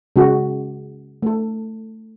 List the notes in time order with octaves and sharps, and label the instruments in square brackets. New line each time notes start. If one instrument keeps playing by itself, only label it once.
[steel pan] C#3 G#3 C#4 F#4
A3 A4